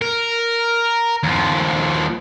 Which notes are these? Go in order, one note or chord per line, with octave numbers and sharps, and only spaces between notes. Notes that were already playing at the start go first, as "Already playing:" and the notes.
A#4
D#2 F3